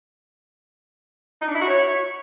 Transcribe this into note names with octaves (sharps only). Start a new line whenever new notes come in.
D#4
D4
E4
F#4
C#5